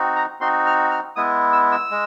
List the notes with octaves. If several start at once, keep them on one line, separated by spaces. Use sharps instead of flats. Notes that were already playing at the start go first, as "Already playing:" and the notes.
Already playing: C4 D#4 F#4
A#5
C4 D#4 F#4 C6
F6
F6
G#3 B3 E4 D#6
E6
E6
G#3